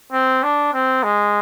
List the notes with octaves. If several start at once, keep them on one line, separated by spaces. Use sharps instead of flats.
C4
D4
C4
G#3